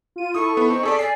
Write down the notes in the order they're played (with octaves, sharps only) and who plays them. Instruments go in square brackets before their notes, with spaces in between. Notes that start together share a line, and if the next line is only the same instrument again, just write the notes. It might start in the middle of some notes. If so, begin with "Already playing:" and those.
[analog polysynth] F4 D#7
[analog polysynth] E4 A4 [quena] C#6 [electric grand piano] D#6
[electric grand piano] B3
[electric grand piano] C4 [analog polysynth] D#4
[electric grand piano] G#4 A4 D5 [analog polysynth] B6
[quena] D5 [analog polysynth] G#5 [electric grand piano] C7